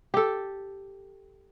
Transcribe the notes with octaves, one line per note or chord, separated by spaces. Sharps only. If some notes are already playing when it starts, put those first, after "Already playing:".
G4 A4